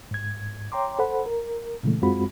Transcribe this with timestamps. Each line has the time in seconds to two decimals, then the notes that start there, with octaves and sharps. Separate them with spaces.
0.11 G#2 G#6
0.72 C#5 G5 A#5 C6 D6
0.99 A4 C5 F#5 B5
1.26 A#4
1.83 A#2 C#3 E3 G#3 A3
2.02 F#2 G#3 C4 F4 F#4 B5